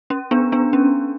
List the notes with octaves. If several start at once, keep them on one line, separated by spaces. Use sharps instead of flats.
C#4
B3 D4
B3 D4
C#4